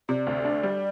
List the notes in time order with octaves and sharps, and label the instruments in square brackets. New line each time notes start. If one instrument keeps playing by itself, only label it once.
[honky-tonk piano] C3 [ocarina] D5
[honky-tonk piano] D2
D4
G3